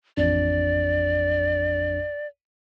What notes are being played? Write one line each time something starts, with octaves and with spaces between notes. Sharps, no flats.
A1 F2 D4 D5